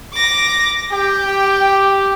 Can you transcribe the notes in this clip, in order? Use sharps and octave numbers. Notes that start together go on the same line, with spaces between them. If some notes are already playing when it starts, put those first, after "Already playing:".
D6 A#6
G4 G5